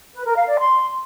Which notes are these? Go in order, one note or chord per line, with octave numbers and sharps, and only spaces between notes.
B4
A#4
F5
D5
C6